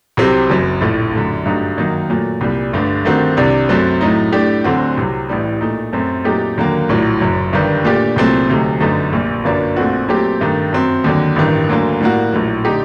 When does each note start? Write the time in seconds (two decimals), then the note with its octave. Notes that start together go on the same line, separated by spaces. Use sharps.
0.17 C2 C3 F#3 C4 G4
0.50 F#1 F#2 F#3
0.81 A#1 A2 A3
1.13 F#2 D3 A3
1.46 G2 F#3 A3 D#4
1.77 F#2 D#3 F#3 A#3 D#4
2.10 A#2 F#3 A3
2.41 C2 A#2 G3
2.73 G1 G2 D3 A3
3.05 G2 D#3 A3 C4 F#4
3.37 C2 C3 G3 D4
3.69 F#2 F#3 A3 C4
4.01 A2 F#3 A3 D#4
4.33 A2 A3 D4 G4
4.64 D2 D3 F#3 C4 F#4
4.97 C2 C3 F#3
5.29 A1 A2 G3
5.61 A#2 A3 D#4
5.93 F#2 F#3 A3 C4
6.24 A#2 F#3 A3 D#4 G4
6.57 D#2 D3 F#3 A#3
6.89 A#1 A2 F#3
7.21 F#1 F#2 F#3
7.53 G1 G2 D#3 G3
7.85 A#2 A3 D4 G4
8.16 C2 A#2 F#3 A3 C4
8.49 D2 C3 F#3 A3 D#4
8.80 G1 F#2 D3 A3 D#4
9.13 A#1 A#2 G3
9.44 G1 F#2 F#3 A#3 D4
9.76 A#1 A#2 A3 C4 F#4
10.08 A#2 F#3 A3 C4 G4
10.41 G2 D#3 A3
10.73 F#2 F#3 C4
11.04 D#2 D3 F#3
11.36 A1 G2 D#3
11.69 D2 D3 F#3 A#3
12.01 A2 G3 A#3 F#4
12.33 A#1 A2 F#3
12.65 D3 A3 D#4 G4